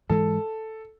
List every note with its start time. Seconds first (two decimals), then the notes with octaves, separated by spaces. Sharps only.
0.09 G#2 E3 G#3 A4